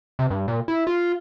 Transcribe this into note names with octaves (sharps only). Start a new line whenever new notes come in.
C3
G2
A#2
E4
F4